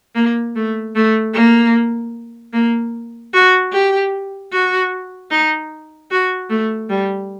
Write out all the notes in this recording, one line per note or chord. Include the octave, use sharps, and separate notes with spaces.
A#3
A3
A3
A#3
A#3
F#4
G4
F#4
D#4
F#4
A3
G3